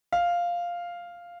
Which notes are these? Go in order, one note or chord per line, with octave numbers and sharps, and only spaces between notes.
F5